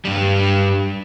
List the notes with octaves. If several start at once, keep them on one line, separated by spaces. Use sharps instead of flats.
G2 G3